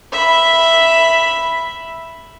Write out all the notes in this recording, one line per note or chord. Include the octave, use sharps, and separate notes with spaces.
E5 B5